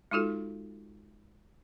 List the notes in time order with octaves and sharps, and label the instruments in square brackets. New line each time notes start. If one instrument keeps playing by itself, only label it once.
[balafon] G#3 D#4 F4 F#4 A4